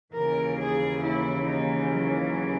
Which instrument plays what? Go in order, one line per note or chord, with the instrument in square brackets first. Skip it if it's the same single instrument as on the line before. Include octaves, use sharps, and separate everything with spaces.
[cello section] D#2 C#3 E3 A#4
G#4
E4
D#4
F#3
F#3